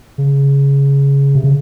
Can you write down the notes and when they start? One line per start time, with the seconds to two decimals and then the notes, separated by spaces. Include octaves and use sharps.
0.18 C#3
1.35 C3
1.44 C#3